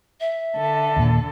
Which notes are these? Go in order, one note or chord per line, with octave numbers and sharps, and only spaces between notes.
E5
D3 A4
D#2 A#2